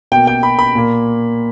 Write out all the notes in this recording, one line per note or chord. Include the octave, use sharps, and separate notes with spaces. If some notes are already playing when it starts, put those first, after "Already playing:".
B2 A#3 G5
G5
B5
B5
A#2 A#3